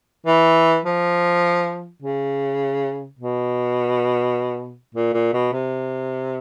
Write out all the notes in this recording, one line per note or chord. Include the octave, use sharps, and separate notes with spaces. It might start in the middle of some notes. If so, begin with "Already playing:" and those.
E3
F3
C#3
B2
A#2
A#2
B2
C3